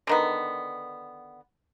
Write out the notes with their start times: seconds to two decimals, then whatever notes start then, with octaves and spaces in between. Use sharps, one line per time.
0.07 D3 D#3 B3